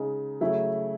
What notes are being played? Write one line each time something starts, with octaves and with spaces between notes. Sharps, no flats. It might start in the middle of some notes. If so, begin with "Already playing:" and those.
Already playing: C#3 G#3 D#4
C#3 F#3 A3 E4